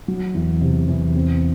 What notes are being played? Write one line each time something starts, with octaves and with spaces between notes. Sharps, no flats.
F#3
E2
C3
E2
C4